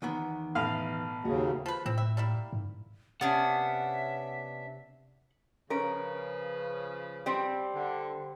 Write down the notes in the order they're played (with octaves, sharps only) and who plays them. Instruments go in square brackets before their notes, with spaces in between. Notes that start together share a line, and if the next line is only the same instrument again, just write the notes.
[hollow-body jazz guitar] E2 D#3 B3
[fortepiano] A1 F5 F6 [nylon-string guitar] B2
[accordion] D#2 C#3 [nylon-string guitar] A#3 F#4
[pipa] F3 B4
[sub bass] A2 [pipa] C4 E4
[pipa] E5
G3 A#3 E4
[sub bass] G#2
[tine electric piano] C3 [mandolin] B3 C#4 D4 [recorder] E5 [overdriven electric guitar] F#5
[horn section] C#3 F3 B4 [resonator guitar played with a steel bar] C#4 A#4
[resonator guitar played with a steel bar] G3 C4
[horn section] D3